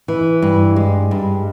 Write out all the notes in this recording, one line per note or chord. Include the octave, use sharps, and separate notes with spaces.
E3
G2
G#3
G2